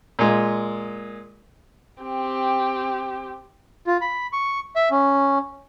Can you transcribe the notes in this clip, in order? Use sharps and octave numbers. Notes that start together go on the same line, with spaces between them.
A#2 G#3
C4 G4
F4
B5
C#6
E5
C#4